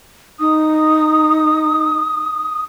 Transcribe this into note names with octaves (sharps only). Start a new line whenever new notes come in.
D#4 D#6